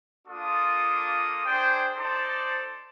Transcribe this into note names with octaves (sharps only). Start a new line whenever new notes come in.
A#3 D4 F4 A4 D#6
D4 G#4 C5 G5
D#4 A4 C5 D5 A5